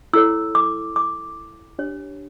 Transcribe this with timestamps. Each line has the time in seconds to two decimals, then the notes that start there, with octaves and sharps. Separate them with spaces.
0.13 E4 A4 C#5 E6
0.55 D6
0.96 D6
1.79 D4 G4 C#5